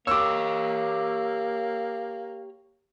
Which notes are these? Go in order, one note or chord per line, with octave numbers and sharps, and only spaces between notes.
A#3 G4 C#5 D6 E6